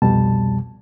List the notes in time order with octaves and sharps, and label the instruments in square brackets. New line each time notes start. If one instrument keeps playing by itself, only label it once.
[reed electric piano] C2 F2 B2 G3 A5